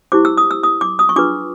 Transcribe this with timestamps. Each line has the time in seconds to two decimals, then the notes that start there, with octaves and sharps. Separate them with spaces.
0.12 E4 G4 C5 D6
0.25 E6
0.37 D#6
0.51 E6
0.63 D#6
0.81 D6
0.99 D#6
1.09 C#6
1.16 D4 F4 G#4 B4 D6